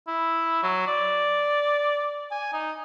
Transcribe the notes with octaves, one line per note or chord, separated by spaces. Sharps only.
E4
F#3
D5
G#5
D#4